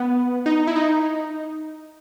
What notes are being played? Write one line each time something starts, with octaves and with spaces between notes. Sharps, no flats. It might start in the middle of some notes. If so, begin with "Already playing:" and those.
Already playing: B3
D#4
E4
D#4